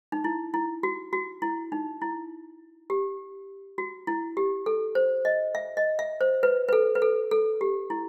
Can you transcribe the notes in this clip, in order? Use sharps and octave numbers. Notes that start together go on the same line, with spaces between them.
D#4
E4
E4
F#4
F#4
E4
D#4
E4
G4
F#4
E4
G4
A4
C5
D#5
E5
D#5
E5
C5
B4
B4
A4
B4
A4
A4
G4
E4